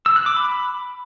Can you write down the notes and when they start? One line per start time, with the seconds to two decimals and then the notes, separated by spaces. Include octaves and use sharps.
0.06 E6
0.16 F#6
0.26 D6
0.36 B5